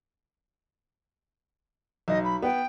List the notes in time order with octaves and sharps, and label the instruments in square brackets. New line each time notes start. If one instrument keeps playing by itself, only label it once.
[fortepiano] B1 [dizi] D#5
[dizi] B5
[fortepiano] B3 [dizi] G5